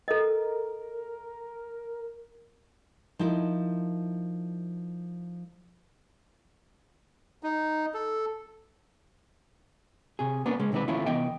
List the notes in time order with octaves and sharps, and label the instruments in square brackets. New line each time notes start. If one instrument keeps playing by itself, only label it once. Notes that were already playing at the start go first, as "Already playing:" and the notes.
[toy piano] A4 D#5 [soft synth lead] A#4
[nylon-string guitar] F3 D#4 E4 A#4
[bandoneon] D#4
A4
[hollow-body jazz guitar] C3 G#4
A#3 B3 C#4 D4 B4
C#3 G#3 C#4
B1 D#3 C4 D4 B4
D3 E3 A3 C#4 E4 F4
C2 E3 B3 D#5 G5